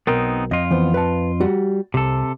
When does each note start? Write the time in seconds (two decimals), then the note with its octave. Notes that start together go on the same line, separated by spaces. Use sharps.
0.07 B1 B3 C4 D#4 A#4
0.51 F2 F4 D#5
0.71 E3 B3 C5
0.94 B4 G5 A5
1.41 G3 F#4 F#5
1.94 C2 C3 A4